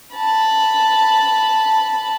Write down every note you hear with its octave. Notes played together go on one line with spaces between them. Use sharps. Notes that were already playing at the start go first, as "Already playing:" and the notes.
A5 B5